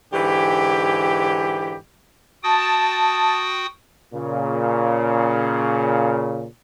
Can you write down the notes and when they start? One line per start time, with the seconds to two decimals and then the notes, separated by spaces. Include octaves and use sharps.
0.13 G#2 D3 E3 G4
2.43 F#4 G5 A5 D#6
4.13 A#2 C#3